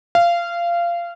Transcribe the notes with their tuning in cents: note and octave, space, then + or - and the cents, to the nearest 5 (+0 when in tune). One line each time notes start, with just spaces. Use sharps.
F5 -20